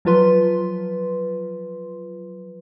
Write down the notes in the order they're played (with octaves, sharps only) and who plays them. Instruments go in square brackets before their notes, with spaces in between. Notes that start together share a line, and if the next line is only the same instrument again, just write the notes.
[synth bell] F3 F#3 F4 B4 C6